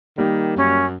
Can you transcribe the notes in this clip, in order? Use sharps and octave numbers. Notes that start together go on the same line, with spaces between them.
D#3 G3 A#3 G4
F#2 C#4